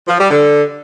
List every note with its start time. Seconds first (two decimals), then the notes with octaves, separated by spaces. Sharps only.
0.08 F3
0.19 G3
0.30 D3